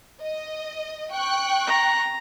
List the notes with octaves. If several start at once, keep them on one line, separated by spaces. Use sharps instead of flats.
D#5
G5 C#6 F#6
A#5